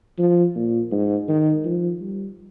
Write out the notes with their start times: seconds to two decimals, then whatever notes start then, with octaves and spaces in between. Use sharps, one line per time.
0.19 F3
0.56 A#2
0.91 G#2
1.28 D#3
1.65 F3
2.01 G3